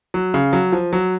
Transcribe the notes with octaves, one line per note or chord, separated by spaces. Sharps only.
F#3
C#3
F#3
F3
F#3